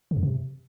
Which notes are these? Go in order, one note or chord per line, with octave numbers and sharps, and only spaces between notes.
C#3
F2
C3